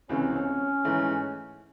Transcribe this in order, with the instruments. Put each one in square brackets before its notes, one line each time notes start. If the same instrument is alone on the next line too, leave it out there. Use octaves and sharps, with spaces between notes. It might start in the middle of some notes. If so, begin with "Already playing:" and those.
[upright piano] C#2 C3 E3 A3 C4 [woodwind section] C#4
[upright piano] G#2 E3 A3